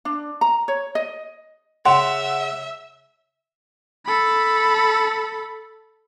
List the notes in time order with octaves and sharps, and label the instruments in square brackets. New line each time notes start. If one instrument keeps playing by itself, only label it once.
[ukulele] D4
A#5
C#5
D#5
[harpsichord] C#3 [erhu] E5 [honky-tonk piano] F#5 [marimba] C6
[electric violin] A4 B5